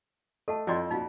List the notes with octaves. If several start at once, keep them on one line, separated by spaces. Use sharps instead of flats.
A3 A4 D#5 F#5 A5
F2 E4 A4 D5 D#5 C6
A#2 A#3 D#4 F4 F#4 F5